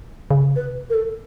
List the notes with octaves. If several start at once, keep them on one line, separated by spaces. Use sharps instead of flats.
C#3
C3 B4
A#4
A4